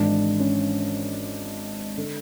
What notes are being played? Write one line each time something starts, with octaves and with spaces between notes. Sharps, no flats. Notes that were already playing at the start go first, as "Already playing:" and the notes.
Already playing: G#1 G#2 E3 D4
C#4
D3